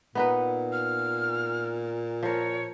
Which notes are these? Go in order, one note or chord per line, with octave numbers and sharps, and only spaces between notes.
A#2 B3 D#4 B4
F6
F3 A#4 C#5